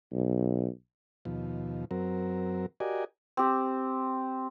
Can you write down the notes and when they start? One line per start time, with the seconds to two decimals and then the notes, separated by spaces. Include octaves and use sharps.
0.13 B1
1.25 D#2 B2 F3
1.91 F#2 F#3 C4 A#4
2.80 F#4 G4 A#4 D5 D#5 G#5
3.37 C4 G4